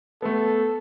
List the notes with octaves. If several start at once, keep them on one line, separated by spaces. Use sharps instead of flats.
A3 B3 A4